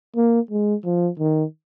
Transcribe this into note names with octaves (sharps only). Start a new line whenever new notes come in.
A#3
G#3
F3
D#3